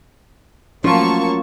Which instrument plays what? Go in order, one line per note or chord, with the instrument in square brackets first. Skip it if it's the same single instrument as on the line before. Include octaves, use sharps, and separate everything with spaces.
[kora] F3 F4 [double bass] F#3 A3 [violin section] A#3 A5 C#6 [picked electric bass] C#4